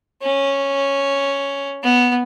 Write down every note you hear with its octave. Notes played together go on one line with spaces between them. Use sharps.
C#4
B3